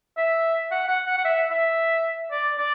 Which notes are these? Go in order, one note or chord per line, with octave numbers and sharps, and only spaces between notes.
E5
F#5
F#5
F#5
F#5
E5
E5
D5
D5